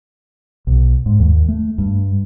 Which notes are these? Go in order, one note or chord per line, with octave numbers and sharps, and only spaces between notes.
B1
G#2
D#2
A3
G2